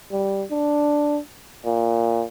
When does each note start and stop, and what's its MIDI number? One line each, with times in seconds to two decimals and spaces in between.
0.12 0.43 55
0.51 1.20 62
1.65 2.25 46